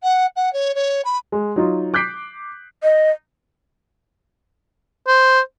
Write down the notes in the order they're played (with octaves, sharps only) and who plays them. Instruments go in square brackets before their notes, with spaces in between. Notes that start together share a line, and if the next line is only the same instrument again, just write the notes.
[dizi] F#5
F#5
C#5
C#5
B5
[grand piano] G#3
F#3 D#4 F4
D6 F#6 G6 B6 C7 D7
[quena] D#5
[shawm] C5